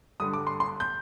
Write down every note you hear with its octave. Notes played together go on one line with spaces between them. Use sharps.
G2 D3 G3 D#6
D6
C6
C6
G6